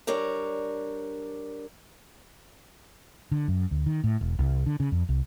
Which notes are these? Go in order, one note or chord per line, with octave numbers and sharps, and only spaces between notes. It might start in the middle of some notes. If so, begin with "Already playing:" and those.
G3 D4 A#4 C#5
D3
F#2
D2
D#3
A2
E1
C2
D3
C#3
F2
C2